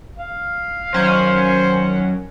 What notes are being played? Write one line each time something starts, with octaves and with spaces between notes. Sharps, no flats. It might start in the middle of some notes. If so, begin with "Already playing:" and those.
F5
F#2 D#3 F#3 C#4 C5 F#5